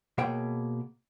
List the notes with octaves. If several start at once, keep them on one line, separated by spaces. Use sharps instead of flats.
B2 A#3 G#4 C#5 F#5 G5